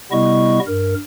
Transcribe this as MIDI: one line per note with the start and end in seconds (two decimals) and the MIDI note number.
0.12 0.59 48
0.12 0.59 55
0.12 0.59 59
0.12 0.59 64
0.12 0.59 75
0.12 0.59 85
0.67 0.95 43
0.67 0.95 70